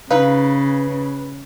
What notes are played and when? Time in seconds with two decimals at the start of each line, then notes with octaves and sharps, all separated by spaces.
0.10 C#3 D#4 B4 F5